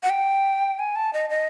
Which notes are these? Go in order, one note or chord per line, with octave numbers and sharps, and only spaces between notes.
F#5
G5
G#5
A5
D#5
D#5